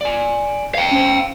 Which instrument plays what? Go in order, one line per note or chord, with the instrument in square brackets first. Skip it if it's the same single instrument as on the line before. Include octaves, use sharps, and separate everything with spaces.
[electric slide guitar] D5 G#5
[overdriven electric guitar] F5 G5
[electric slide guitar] C#4 C5